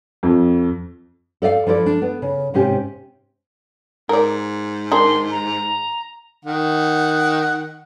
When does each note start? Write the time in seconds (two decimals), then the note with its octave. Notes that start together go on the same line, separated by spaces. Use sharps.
0.23 F2
1.42 A4 D5 D#5 F5
1.66 F3 E4 A4 D5
1.86 D4
2.02 B3
2.22 C#3
2.54 G#2 C3 C#4 G4 G#5
4.09 G#2 A#4 D5
4.92 D#3 G#3 D4 C6
5.31 A#5
6.45 D#3 F#5